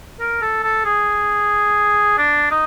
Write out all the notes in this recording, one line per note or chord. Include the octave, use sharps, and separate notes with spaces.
A#4
A4
A4
G#4
D4
D#4